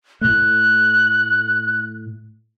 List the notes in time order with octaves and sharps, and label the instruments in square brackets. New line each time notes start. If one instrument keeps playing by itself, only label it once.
[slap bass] A2 A3 [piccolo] F#6